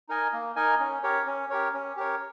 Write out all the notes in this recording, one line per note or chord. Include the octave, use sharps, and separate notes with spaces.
D#4 A#4 D#5 G#5
A#3
D#4 A#4 D#5 G#5
C#4
G4 A#4 C#5
C#4
G4 A#4 C#5
C#4
G4 A#4 C#5